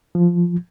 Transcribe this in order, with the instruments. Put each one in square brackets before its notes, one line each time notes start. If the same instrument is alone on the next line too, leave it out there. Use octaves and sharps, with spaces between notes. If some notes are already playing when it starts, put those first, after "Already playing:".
[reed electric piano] F3